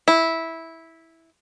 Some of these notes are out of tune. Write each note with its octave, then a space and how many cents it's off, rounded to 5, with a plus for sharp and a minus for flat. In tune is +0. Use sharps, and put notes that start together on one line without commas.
E4 -10